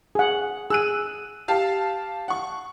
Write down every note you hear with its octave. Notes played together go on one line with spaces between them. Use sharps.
G#4 F#5
G#4 E6 F#6 D#7
G4 F5 A5
F#5 C#6